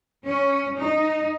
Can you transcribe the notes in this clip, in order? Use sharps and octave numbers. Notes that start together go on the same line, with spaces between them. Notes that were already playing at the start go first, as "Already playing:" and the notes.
C#4
D#4